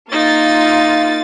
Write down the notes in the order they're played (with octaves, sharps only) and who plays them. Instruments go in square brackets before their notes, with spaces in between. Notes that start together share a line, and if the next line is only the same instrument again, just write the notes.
[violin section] A#3 F4 A6 [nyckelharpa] D#4